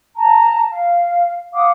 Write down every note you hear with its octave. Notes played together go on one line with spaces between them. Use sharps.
A5 A#5
F5
F5 F#5 D6 D#6